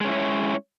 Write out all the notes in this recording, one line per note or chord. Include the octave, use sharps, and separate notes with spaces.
G#3 C#4 E4 C#5